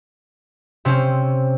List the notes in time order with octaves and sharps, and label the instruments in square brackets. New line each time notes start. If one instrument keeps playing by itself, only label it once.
[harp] C3 C4 C#4